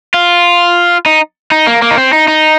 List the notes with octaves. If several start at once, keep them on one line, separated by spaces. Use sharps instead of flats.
F4
D#4
D#4
A#3
A#3
D#4
C4
D#4
D#4